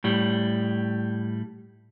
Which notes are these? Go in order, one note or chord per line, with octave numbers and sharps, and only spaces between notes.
A2 G3